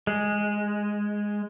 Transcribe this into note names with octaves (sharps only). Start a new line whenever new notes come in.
G#3